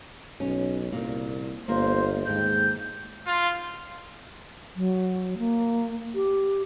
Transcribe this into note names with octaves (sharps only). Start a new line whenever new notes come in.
B1 C#4
C2 A#2
G1 A#3 C5
D#2 G#2 G5 G6
F4
F#3
A#3
G4